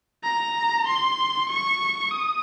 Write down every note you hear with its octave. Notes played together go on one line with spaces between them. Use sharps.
A#5
C6
C#6
D#6